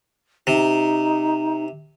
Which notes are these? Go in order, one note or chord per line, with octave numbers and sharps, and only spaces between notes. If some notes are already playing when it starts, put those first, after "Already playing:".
C3 D#4